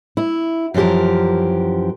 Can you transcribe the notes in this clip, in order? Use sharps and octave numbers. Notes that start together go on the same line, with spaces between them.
E4
F#2 E3 F3 G4 A#4